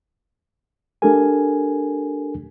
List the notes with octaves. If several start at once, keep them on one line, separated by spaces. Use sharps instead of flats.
A3 D4 G4 A4 A#4 G#5